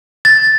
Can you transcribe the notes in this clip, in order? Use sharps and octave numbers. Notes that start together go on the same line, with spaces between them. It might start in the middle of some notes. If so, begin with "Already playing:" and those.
A6